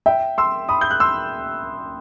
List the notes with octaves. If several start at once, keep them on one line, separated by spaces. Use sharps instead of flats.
E5 G5
C6 E6
B5 D#6
G6
F#6
C6 E6